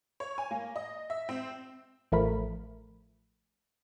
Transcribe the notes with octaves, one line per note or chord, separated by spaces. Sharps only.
C#5
G#5
A#3
D#5
E5
C4
A1 F3 A3 A#4 B5